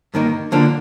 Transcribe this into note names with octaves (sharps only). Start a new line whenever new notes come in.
G2 D#3 A#3 D#4
D3 F3 A#3 D4